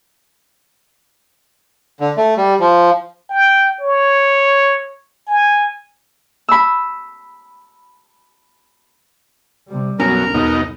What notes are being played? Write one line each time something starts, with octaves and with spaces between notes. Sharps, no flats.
D3
A3
G3
F3
G5
C#5
G#5
B5 E6
C3 G3
B1 F#2 B2 C#4 A#4 A#5
E2 B2 D#4